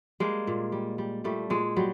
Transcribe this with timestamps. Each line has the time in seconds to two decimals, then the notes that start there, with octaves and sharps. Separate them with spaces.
0.20 G3 G#3 A#3
0.47 A#2
0.72 G3
0.98 G3
1.24 A#2 G3 A3
1.50 A#2 G#3
1.76 F#3 G3